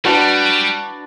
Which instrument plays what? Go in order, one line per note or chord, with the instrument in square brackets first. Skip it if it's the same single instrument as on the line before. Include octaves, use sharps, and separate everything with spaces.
[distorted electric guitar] G3 [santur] D4 F#4 B4